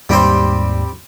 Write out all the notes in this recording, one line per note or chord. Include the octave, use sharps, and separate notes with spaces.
D#2 G#2 G3 C4 C5 D5